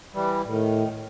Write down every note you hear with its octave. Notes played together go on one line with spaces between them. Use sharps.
E3 G3
A2 D#3